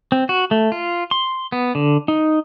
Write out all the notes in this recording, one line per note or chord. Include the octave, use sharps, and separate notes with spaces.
C4
F#4
A3
F4
C6
B3
D3
D#4